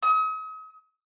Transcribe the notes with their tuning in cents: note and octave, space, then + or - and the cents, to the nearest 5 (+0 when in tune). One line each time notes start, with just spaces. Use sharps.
D#6 +40